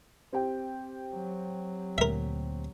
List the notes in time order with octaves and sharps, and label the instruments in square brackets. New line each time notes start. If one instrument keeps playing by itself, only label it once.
[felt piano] C4 G4 G5
[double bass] F#3
[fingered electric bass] D2 A#2 [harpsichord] A#4 E5